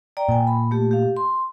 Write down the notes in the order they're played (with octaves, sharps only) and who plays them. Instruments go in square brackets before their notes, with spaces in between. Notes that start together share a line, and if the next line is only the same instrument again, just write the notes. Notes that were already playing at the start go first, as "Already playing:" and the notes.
[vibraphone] D5 G5 A#5
[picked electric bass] A#2 [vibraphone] G5 G#5
[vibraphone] B5
A3 G4
G4 F5
C6